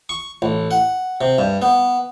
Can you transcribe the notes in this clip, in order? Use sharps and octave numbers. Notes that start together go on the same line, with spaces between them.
C#6
A1
F#5
C3
G2
B3